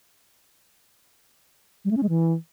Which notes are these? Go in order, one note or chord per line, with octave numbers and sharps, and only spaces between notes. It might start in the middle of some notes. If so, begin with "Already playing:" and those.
G3
A3
C#4
G#3
E3